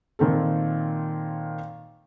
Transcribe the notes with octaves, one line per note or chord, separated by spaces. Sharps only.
A#2 D#3 C4 A4